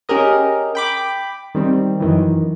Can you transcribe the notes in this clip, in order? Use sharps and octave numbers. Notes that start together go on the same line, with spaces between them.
C#4 G4 G#4 A#4 D#5
G5 B5 D6
D#3 G3 C4
F#2 D#3 E3